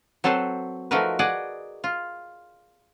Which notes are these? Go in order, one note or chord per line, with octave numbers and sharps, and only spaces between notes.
F#3 C4 A4 B4 C5
F3 A3 D#4 F#4 A#4 B4
G#4 D5 D#5 F#5
F4